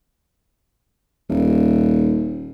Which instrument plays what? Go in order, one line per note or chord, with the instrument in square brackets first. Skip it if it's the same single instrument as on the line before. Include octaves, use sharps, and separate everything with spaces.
[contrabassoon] D#1